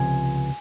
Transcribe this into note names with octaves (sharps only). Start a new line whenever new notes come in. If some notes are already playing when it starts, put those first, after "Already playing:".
Already playing: C#2 C3 F3 G#5